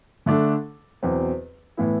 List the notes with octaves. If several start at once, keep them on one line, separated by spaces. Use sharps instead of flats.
D3 A3 D4 A4
E2 B2 F#3 C4
A2 E3 B3 E4